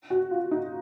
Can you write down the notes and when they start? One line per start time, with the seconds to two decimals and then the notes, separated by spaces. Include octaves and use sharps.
0.10 F#4
0.31 F4
0.51 D#4